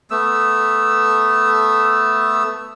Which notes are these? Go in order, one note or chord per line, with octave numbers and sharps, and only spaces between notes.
A3 B3 E6